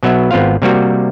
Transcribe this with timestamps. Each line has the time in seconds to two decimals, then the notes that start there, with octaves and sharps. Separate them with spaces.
0.03 B2 F#3 B3 E5
0.31 G#1 B3 C4 F4 F5
0.62 C3 G3 A#3 F#4